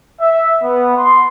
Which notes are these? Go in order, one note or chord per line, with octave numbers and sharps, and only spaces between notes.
E5
B3
C6